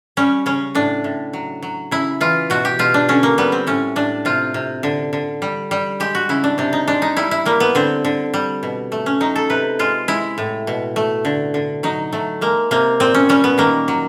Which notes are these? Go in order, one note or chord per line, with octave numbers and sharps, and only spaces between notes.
G3 C#4
C#3 C#4
A2 D4
A2
F#3
F#3
C#3 E4
E3 F4
B2 F#4
G4
B2 F4
D4
D3 C#4
A#3
G3 B3
C4
A2 C#4
A2 D4
C3 F4
C3
D3
D3
G3
G3
G#3 G4
F#4
C#3 E4
D4
C3 D4
D#4
G#3 D4
D#4
G3 E4
E4
G3 A#3
B3
D3 C4
D3
G3
B2
A3
C#4
F#3 D#4
A4
C3 B4
G#3 F4
G#3 E4
A2
B2
A3
D3
D3
F#3 D#4
F#3 A3
G#3 A#3
C3 A#3
A#2 C4
C#4
G3 C#4
B3
D#3 A#3
F#3